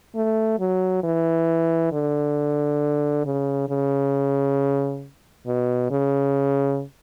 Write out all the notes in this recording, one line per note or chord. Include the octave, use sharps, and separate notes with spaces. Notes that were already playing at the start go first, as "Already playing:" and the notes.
A3
F#3
E3
D3
C#3
C#3
B2
C#3